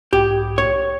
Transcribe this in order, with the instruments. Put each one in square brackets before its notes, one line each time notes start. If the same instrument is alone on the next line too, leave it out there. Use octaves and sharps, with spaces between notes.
[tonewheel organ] B1 G#2 [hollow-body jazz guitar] G4
[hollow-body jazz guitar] C#5